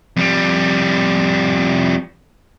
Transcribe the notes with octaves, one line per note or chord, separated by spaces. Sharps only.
F2 G3